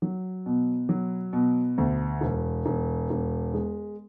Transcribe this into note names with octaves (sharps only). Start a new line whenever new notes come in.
F#3
B2
F#3
B2
D2
E1
E1
E1
G#3